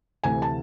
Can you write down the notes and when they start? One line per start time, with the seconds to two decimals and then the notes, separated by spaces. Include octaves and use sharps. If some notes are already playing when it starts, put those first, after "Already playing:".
0.24 D2 C3 E3 A3 G#5
0.42 A5